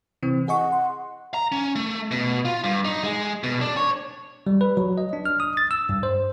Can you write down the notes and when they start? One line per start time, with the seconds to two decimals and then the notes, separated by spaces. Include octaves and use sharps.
0.23 C3 E3 C4
0.48 G#4 D#5 F#5 C#6
0.72 C6
1.34 A#5
1.52 C#4
1.76 A3
2.11 B2
2.45 F4
2.64 G2
2.85 D#4
3.04 G#3
3.43 B2
3.61 D4
3.77 C#5
4.47 G3
4.61 B4
4.77 F#3
4.98 D#5
5.13 D4
5.25 F6
5.40 D#6
5.57 A6
5.71 E6
5.89 G2
6.03 C5